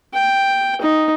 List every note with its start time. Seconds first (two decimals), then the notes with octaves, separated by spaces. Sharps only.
0.14 G5
0.81 D#4